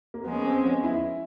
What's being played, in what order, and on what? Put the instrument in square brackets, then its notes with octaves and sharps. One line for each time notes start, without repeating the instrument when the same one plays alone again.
[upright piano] A#3
[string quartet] F3 G#3 C#4 [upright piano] B3
[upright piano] C4
B3
E4